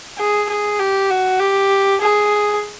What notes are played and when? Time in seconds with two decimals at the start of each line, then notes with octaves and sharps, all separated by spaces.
0.18 G#4
0.49 G#4
0.79 G4
1.10 F#4
1.40 G4
2.01 G#4